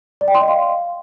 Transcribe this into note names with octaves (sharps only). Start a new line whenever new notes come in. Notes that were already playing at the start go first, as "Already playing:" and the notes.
D5
G5
C6
D#5
F5